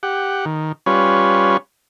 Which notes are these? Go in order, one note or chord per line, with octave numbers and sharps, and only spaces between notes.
G4 F#5
D#3
G3 C#4 F4 B4 C#5